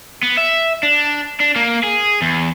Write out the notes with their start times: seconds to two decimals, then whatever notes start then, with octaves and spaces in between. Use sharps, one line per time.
0.23 B3
0.37 E5
0.83 D4
1.40 D4
1.56 A#3
1.84 G#4
2.22 E2